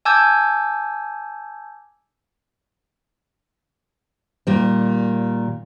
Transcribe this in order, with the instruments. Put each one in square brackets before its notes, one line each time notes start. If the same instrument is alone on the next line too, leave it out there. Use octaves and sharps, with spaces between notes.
[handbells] G#5 A5 D6 E6 G6 G#6
[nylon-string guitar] A#2 D#3 G3